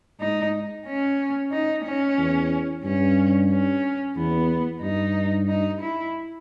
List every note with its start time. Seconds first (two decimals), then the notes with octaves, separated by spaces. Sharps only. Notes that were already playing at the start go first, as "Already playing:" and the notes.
0.20 G#2 D#4
0.87 C#4
1.52 D#4
1.85 C#4
2.18 E2
2.84 G2 C#4
3.50 C#4
4.16 E2 B3
4.82 G2 D#4
5.48 D#4
5.81 E4